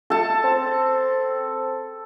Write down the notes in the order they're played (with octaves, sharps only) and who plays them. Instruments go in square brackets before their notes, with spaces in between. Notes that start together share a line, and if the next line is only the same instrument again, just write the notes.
[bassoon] A3 [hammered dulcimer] A4 A5
[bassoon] C4